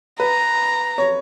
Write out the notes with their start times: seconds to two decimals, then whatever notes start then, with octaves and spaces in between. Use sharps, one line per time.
0.20 B4 A#5
0.98 C#5